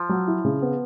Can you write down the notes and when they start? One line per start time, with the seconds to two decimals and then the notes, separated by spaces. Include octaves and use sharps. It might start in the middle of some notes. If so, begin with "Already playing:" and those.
Already playing: F3
0.09 F#3
0.28 E4
0.45 C#3
0.62 B3